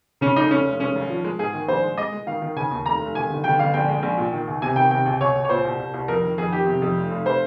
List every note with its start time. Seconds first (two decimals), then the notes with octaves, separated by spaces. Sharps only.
0.21 C#3 C#4
0.36 F1 D#4
0.51 F1 C#4
0.65 F1
0.80 G#3 C#4
0.95 G#1
1.10 F3
1.24 G#3
1.39 G#2 G#4
1.54 D#3
1.68 A#1 C5
1.83 G#3
1.97 G#3 D#5
2.12 G#3
2.27 D#3 F5
2.42 D#3
2.56 C#3 G#5
2.71 D#2
2.86 F1 A#5
3.01 F1
3.15 D#3 G#5
3.30 G1
3.44 G1 G5
3.59 G1 F5
3.74 A#1 G5
3.88 G#3
4.03 A#1
4.17 A#2
4.32 D#3
4.47 C#2
4.62 C3 G#5
4.76 D#3 G5
4.91 C3 G5
5.06 C#2
5.20 C#2 C#5
5.35 C#2
5.45 C#5
5.49 A#2 C5
5.65 C2
5.79 C2
5.94 C2
6.08 F2 A#4
6.23 D#3
6.38 F2 G#4
6.52 D#3 G4
6.67 C3
6.82 F2
6.96 F1
7.11 F1
7.26 C5